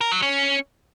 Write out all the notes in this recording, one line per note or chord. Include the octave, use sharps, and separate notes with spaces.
A#4
F#3
C#4